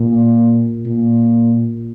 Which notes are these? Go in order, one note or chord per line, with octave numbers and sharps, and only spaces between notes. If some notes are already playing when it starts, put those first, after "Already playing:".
Already playing: A#2
A#2